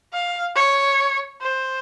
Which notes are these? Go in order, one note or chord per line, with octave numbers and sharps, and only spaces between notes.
F5
C#5
C5